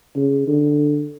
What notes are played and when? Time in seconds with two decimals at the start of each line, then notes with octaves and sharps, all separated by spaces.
0.16 C#3
0.47 D3